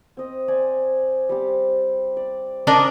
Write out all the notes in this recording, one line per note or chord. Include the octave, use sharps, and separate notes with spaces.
C4 D#5
C5 D5 G#5
G3 C4 G4
D5
D4 A#4 D5 D#5 G#5